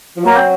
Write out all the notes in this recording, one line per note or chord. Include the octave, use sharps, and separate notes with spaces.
F3
F#3 A#3
C4